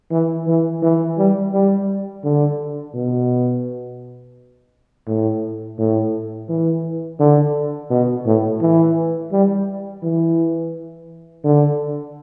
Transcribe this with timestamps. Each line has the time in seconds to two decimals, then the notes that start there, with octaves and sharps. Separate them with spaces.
0.11 E3
0.47 E3
0.82 E3
1.18 G3
1.53 G3
2.24 D3
2.94 B2
5.07 A2
5.78 A2
6.49 E3
7.19 D3
7.90 B2
8.26 A2
8.61 E3
9.32 G3
10.03 E3
11.44 D3